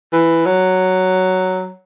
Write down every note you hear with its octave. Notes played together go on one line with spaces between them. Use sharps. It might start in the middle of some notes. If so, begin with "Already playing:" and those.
E3
F#3